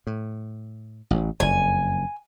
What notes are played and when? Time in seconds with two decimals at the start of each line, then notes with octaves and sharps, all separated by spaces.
0.07 A2
1.11 A1 A2
1.40 F#1 F2 G#5